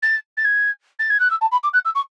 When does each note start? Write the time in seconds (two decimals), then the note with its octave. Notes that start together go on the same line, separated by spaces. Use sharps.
0.03 A6
0.37 A6
0.45 G#6
0.99 A6
1.10 G#6
1.20 F#6
1.30 E6
1.41 A5
1.52 B5
1.63 D6
1.73 F#6
1.85 E6
1.95 C#6